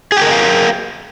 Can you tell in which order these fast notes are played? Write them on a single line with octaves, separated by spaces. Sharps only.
G#4 G5 A#4 D#5 F5